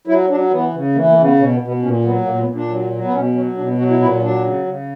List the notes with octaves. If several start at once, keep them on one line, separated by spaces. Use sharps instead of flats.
F#3 E4
F#3 D4
E3 B3
C#3
E3 A#3
A#3
C#3
B3
B2 C#4
B3
B2
B3
A#2 C#4
F#3 B3
A#2 A#3
B3
A#2
D4
F#3
F#3
B3
B2 C#4
F#3 C#4
B2 D4
B3
F#3 F#4
E4
A#2 E4
F#3 D4
C#3
C#3